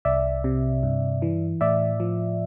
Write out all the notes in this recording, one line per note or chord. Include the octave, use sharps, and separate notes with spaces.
C2 D5 E5
C3
G2
E3
A2 D5 E5
F3